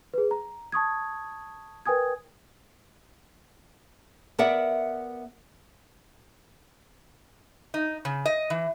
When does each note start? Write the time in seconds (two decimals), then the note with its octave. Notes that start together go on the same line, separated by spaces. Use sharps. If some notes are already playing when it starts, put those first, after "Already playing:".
0.14 G#4 B4
0.31 A#5
0.72 A5 C#6 D#6 G#6
1.86 A#4 B4 G5 G#5 D#6 G#6
4.39 B3 A#4 D5 E5 F#5
7.74 D#4
8.05 C#3
8.26 D#5
8.50 E3